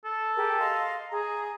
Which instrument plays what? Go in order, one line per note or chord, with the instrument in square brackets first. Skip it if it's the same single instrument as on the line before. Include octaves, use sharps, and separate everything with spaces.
[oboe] A4
[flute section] G4 G#4 A#4
D#5 F5 C6
[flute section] G#4 [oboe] A#5